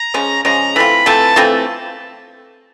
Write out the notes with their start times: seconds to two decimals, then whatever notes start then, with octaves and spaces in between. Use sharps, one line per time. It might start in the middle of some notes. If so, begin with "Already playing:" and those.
Already playing: A#5
0.14 C#3 F3 G#3 C#4
0.44 C#3 F3 G#3 C#4 A#5
0.75 E3 A3 C4 F4 B5
1.06 E3 A3 C4 F4 A5
1.36 E3 A3 C4 F4